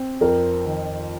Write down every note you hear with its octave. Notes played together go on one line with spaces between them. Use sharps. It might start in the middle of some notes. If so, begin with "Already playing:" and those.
Already playing: C4
F2 A#4
D#3